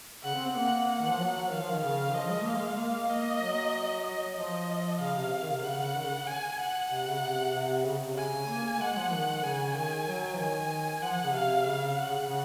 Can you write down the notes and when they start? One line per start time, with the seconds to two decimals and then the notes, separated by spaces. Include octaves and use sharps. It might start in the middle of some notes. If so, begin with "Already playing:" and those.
0.23 C#3 F#5
0.34 C4
0.45 C4
0.55 A#3 F#5
0.88 F#5
1.01 D#3
1.09 F3
1.19 F#3
1.51 D#3 F5
1.61 F3
1.71 D#3
1.83 C#3 F5
2.14 F3 D#5
2.31 G#3
2.43 A#3 F5
2.56 G#3
2.77 A#3
3.09 A#3 D#5
3.41 F#3
4.05 D#5
4.36 F3 D#5
4.99 C#3 F5
5.15 C3
5.42 D#3
5.52 C3
5.63 C#3 F#5
5.94 D#3
6.05 C#3
6.27 G#5
6.58 F#5
6.90 C3
7.06 C#3
7.21 C3
7.54 C3
7.85 C#3
8.01 C3
8.17 C#3 G#5
8.32 C#3
8.49 A#3
8.80 G#3 F#5
8.97 F3
9.12 D#3
9.44 C#3 G#5
9.75 D#3
10.08 F#3
10.39 D#3 G#5
11.02 F3 F#5
11.24 C#3
11.34 C3 F5
11.66 C#3
11.97 F#5
12.08 C#3
12.18 C#3
12.29 C#3